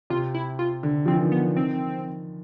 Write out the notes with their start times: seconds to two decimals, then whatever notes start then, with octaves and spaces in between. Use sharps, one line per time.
0.10 C3 F4
0.34 E4
0.59 F4
0.83 D3
1.06 F3 C4
1.13 E3
1.21 D#3
1.32 B3
1.57 D#3 C4